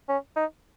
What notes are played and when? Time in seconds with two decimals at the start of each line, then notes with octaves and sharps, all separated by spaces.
0.09 C#4
0.36 D#4